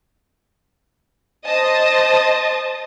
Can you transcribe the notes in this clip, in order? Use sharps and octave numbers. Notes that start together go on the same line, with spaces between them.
C5 D#5 A5 D#6